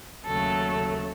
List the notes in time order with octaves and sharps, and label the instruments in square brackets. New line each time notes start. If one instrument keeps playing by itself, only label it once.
[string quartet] D#2 C#3 F#3 A3 A4